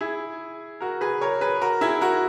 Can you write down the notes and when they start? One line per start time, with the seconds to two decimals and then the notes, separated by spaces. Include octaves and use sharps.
0.01 E4 G#4
0.81 F#4 A#4
1.01 G#4 B4
1.21 A#4 C#5
1.41 G#4 B4
1.62 F#4 A#4
1.81 E4 G#4
2.01 F#4 A#4